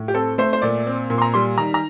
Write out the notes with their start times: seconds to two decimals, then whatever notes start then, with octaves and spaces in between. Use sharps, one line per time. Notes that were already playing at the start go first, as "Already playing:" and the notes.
Already playing: A2
0.08 G4
0.14 C4 A4
0.38 A3 C5
0.53 C5
0.62 A#2 D5
0.87 C4
1.10 A#2
1.18 C6
1.22 A#5
1.34 G3 C6
1.58 D#3 A#5
1.74 A#5